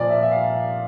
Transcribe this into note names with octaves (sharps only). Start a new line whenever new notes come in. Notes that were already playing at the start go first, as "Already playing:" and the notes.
Already playing: A#2 F3 D5
E5
E5
F5